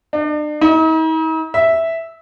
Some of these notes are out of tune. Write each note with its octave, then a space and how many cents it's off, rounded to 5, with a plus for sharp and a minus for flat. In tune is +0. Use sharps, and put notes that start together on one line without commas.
D4 +40
D#4 +45
E5 -5